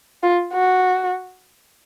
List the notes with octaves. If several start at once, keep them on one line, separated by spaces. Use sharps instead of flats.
F4
F#4